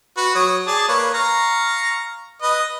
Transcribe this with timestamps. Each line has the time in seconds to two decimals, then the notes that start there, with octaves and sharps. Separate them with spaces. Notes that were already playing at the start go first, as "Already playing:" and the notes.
0.17 F#4 B4
0.35 F#3 C#5 D#6
0.67 G#4 D5 A5
0.88 A#3 B4 C#5
1.14 F5 A#5 C#6
2.42 B4 D#5